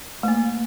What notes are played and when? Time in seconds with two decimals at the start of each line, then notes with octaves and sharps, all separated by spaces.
0.23 A3
0.28 A#3